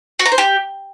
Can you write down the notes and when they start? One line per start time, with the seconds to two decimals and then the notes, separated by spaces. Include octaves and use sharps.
0.19 F#4
0.26 A#5
0.32 C5
0.38 G4